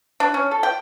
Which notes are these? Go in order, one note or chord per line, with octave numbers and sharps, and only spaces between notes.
D4
C#4
A4
G5